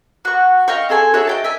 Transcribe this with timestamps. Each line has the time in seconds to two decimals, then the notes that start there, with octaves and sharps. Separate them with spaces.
0.25 F#4 C#6
0.68 D#5 F5 G5 C#6
0.89 C4 G#4 A4 G#5
1.14 F#4 G#4 C#5 E5
1.27 D#5 G5 A5
1.44 E5 G#5